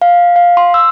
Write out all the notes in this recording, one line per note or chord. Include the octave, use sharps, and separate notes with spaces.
F5
F5
C6
E6